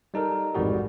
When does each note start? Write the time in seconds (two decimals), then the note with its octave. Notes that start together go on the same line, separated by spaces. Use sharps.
0.14 G3 D#4 A4 A#4
0.54 A1 F2 G#2 G3 F#4 G#4